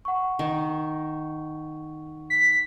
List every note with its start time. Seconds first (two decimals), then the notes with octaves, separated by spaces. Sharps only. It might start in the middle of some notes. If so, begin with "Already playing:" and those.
0.05 F#5 C#6
0.39 D#3
2.30 B6